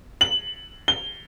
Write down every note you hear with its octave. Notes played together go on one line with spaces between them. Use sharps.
F#7
G7